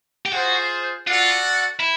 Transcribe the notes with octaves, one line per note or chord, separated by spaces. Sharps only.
G4
F4 F#4 G#4 C5
F4 F#4 A4 D5 F#5
E4